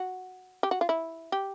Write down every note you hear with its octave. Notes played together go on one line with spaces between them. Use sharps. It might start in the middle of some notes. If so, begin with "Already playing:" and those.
Already playing: F#4
G4
F#4
F4
E4
G4